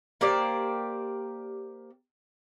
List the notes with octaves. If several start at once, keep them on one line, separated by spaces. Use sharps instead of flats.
A#3 G4 C5 D5